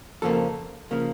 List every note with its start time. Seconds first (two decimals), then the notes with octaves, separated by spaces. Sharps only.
0.22 F2 C#3 F3 A#3 A4
0.91 C#3 F3 A#3